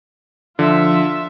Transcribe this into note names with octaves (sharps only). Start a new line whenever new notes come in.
D3 F3 F4 E5